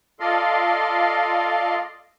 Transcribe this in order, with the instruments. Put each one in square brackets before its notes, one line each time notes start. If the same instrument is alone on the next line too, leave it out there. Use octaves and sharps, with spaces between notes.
[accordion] F4 A4 D5 D#5 F5 C6